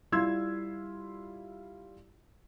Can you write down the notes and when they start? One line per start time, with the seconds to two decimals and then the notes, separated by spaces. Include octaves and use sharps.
0.12 G3 E4 F4 C6 E6 G#6